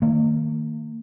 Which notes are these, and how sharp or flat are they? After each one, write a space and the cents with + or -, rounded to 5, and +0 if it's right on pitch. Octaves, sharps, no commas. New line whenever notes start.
D#3 +0 A#3 -40